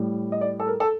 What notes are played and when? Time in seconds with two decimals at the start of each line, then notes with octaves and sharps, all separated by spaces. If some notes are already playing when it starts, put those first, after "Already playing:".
Already playing: A2 G3
0.32 D#5
0.41 D5
0.60 A4
0.67 A#4
0.80 A4